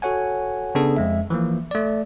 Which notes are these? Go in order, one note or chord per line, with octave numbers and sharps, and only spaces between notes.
F#4 A4 C#5 F#5 G#5
C#3 B3 D4 G#4 A4
F2 G#3 E5
E3 F3 A#3
A3 D5